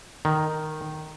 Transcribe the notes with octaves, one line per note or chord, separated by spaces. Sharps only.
D#3